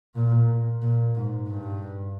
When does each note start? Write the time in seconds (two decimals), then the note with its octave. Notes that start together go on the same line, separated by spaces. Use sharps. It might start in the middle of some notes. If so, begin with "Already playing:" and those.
0.15 A#2
0.82 A#2
1.15 G#2
1.48 G2